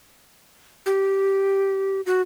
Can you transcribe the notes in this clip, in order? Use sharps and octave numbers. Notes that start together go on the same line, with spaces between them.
G4
F#4